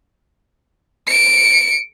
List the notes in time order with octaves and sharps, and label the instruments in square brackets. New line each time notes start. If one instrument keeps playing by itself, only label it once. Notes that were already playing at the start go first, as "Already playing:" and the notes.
[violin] C#7 D7